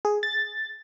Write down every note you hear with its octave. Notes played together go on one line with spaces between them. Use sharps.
G#4
A6